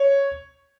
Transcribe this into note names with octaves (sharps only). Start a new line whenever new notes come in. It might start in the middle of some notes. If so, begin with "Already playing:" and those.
Already playing: C#5